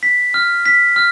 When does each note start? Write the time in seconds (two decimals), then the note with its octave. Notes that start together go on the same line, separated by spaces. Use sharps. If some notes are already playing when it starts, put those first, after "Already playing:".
0.03 B6
0.34 F6
0.66 B6
0.96 F6